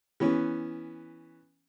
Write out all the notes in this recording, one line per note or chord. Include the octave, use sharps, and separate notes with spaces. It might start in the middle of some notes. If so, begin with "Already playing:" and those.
E3 B3 C#4